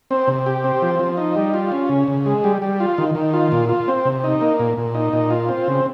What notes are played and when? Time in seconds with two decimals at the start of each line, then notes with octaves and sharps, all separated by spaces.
0.11 C4
0.28 C3
0.46 G4
0.64 C4
0.82 F3
0.99 F3
1.17 D#4
1.36 G3
1.54 F4
1.72 C#4
1.89 C#3
2.08 C#3
2.26 G#3
2.44 G3
2.62 G3
2.80 F4
2.98 D#3
3.15 D#3
3.33 F4
3.52 A#2
3.69 F4
3.88 C4
4.05 C3
4.24 D#4
4.41 A#3
4.59 A#2
4.77 A#2
4.94 D#4
5.13 A#2
5.30 F4
5.49 C4
5.68 C#3